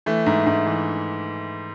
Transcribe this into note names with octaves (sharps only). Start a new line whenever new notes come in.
E3 A3
G#2
G#2
E3